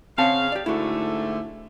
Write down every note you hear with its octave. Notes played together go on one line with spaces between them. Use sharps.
C#3 C4 F5 F#5 A5
G4 D5
G#2 D3 A3 E4 F#4